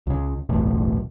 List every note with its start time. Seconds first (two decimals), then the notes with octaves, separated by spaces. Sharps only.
0.07 C#2 C#3
0.49 F#1 B1 E2 A2